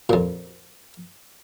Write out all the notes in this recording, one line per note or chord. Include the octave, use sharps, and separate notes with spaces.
F2 A#2